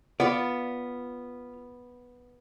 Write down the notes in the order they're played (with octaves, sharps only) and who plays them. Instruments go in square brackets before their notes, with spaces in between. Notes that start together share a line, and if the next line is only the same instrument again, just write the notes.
[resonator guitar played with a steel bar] B3 [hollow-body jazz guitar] F4 D5